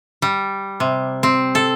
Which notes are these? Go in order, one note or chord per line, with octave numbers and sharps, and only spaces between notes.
G3
C3
C4
A4